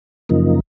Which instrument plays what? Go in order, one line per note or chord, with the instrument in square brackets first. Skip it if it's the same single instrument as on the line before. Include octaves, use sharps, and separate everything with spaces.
[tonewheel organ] F#2 C#3 F3 A#3 D#4